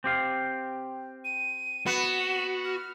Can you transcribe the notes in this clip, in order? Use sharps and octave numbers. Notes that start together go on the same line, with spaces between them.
C4 G4 F5
D#7
B3 F#4 E7
F6